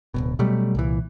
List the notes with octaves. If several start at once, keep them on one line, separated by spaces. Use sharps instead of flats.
D1 G1 B2
B2 F#3 G3 A3
C2 A#2 E3